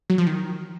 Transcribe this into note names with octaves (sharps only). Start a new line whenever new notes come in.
F#3
F3
D#3